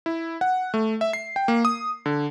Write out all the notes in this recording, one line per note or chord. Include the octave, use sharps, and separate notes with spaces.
E4
F#5
A3
E5
C7
G5
A#3
D#6
D3